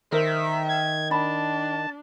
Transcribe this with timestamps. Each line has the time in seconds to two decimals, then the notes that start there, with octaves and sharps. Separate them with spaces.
0.12 D#3 D#4 A#4 C5 E5
0.69 G#6
1.11 D4 A5 B5